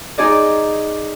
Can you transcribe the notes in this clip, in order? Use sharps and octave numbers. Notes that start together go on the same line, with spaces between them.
D#4 G#4 D5 D#5